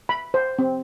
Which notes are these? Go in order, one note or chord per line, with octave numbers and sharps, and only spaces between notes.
B5
C5
C4